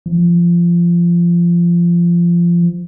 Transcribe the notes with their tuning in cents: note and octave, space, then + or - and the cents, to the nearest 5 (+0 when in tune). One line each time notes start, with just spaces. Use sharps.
F3 -20